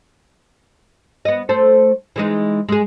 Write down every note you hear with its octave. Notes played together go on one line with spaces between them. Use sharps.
B3 D#5
A3 A4 C5
E3 G#3 D#4
G#3 G#4